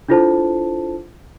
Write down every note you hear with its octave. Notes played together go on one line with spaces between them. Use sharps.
D4 E4 F4 A4 C5 A5